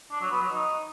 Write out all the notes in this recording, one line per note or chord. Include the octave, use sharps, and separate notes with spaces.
D4
F#3
B3
F#3
D#4